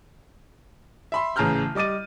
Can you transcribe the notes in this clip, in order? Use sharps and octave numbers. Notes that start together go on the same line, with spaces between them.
E5 B5 C6
A1 C#3 A5 A#5 F6 G6
G3 D#5 D6 A6 D#7